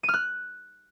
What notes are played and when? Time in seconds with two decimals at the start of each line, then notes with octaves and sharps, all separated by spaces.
0.03 D#7
0.08 F6
0.14 F#6